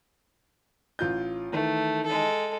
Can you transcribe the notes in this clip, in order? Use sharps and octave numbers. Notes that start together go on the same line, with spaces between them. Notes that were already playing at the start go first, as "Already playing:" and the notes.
A1 F4 G6
D#3 E3 A3
G#3 A4